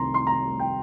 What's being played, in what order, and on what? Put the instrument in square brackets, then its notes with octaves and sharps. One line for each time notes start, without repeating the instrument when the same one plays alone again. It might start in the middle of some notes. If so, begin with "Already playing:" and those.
Already playing: [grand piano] C2 C3 D#3 A#5 C6
C6
A#5
G5